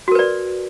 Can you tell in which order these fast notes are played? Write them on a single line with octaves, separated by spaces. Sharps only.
F#4 A#4 B4 D5